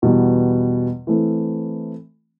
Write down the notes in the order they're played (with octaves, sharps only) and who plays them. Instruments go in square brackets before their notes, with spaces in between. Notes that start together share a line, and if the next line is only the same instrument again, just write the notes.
[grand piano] E2 B2 G3
E3 A3 C4